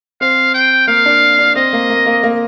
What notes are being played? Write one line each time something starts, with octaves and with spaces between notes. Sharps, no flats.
C4 F5
G5
A#3 F5
D4
D4
C4 D#5
A#3
A#3
A#3
A#3